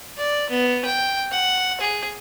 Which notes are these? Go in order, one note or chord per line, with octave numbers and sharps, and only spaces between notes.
D5
B3
G5
F#5
G#4